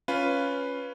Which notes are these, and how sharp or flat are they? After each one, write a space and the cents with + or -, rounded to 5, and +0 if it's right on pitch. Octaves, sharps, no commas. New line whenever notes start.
C#4 +0 F4 +0 B4 +0